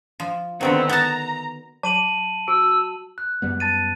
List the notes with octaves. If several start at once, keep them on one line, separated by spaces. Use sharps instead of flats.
F3
D3 D#3 F#3 B3 C4
B3 A5 A#5
F#3 A5 D#7 F#7
F#4 E6
F#6
F#2 G3 B3
A5 A6 D#7